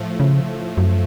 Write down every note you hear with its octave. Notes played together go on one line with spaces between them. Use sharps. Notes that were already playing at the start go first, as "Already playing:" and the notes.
Already playing: A2 F3 A3
C#3
F#2